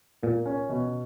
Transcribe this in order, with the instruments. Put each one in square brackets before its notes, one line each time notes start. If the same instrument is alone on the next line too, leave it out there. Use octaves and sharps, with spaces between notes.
[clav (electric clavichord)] A#2 [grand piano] A#3
[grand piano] C#4
B2